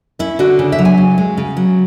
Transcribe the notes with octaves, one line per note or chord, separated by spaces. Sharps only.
C#4 E4
D3 F#4
C#3
E5
F#3
G#5
C#3
G#3
C#3
F#3